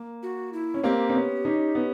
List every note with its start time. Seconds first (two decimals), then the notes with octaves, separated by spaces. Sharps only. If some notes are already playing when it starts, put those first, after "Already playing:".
Already playing: A#3
0.23 F#4
0.53 E4
0.74 C#4
0.84 A#3 C4 G4
1.10 C4
1.14 B3 C#4
1.45 C#4 D#4
1.75 B3 C#4